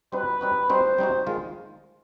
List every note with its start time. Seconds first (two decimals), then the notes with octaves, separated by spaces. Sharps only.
0.12 G3 C4 D#4 F#4 B4
0.41 G3 C4 D#4 F#4
0.69 G3 C4 D#4 F#4 C5
0.98 G3 C4 D#4 F#4
1.27 D#3 G#3 F4